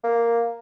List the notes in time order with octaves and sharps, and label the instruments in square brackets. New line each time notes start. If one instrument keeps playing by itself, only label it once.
[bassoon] A#3